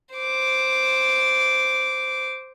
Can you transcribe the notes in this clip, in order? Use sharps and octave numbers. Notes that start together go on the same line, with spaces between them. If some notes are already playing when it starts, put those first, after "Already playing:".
C5 D6